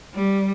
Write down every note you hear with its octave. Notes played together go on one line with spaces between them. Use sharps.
G3